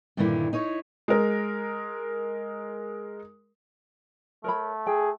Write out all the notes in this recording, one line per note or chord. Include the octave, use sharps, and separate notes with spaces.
G2 A#2 D3 D#3 E4
D#4 E4 C#5
G#3 A#4
A3 A#4 C#5 B5
G#4 G5